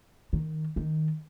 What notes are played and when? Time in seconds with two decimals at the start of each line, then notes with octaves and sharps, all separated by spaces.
0.33 D#3
0.76 D#3